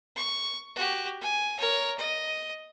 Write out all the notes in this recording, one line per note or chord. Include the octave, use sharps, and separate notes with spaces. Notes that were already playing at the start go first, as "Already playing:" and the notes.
C#6
F#4 G4
G#5
A#4 C#5
D#5